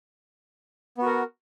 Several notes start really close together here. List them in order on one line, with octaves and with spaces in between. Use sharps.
B3 F#4 A#4